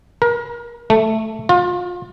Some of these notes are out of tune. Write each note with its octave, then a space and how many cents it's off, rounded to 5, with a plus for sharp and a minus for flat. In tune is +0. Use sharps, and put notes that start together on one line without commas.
A#4 +30
A3 +0
F4 +30